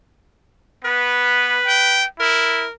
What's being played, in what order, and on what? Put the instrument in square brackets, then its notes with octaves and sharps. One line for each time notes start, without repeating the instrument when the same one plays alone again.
[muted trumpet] B3 [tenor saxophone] B4
[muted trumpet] G5
[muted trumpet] E4 [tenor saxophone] A#4